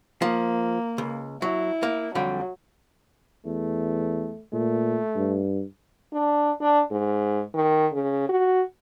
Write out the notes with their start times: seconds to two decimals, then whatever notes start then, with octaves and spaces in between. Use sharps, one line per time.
0.22 F3 A#3
0.98 C#2
1.42 F#3 E4
1.83 A#3
2.15 F2 D3 F#3 G3
3.45 E2 A3
4.53 A#2 A3
5.16 G2
6.13 D4
6.61 D4
6.91 G#2
7.55 D#3
7.93 C#3
8.29 F#4